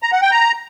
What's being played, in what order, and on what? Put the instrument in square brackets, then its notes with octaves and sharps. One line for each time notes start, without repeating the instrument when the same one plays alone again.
[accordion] A#5
F#5
G5
A#5